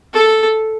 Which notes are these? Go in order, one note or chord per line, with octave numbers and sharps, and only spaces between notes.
A4